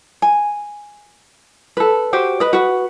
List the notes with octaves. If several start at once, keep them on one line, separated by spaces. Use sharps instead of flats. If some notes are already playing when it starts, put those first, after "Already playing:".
G#5
A4 B4
F#4 G4 C5
B4 D#5
F#4 B4